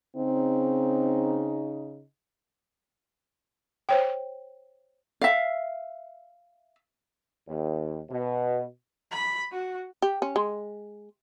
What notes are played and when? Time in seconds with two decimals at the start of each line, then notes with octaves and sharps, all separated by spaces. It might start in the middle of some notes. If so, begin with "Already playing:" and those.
0.16 C#3 C4 D#4
3.89 C5 C#5 G5
5.21 E5 F5
7.48 D#2
8.10 B2
9.12 B5
9.52 F#4
10.02 G4
10.22 C#4
10.36 G#3